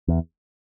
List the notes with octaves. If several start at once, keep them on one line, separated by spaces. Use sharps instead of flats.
E2